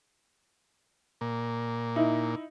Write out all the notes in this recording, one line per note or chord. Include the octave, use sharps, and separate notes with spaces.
A#2
D#4 E4